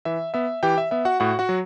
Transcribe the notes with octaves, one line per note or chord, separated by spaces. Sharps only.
E3 E5
B3 E5
E3 G4 G5
E5
B3 E5
F#4 F#5
A2 F#4 F#5
F#4 F#5
F#3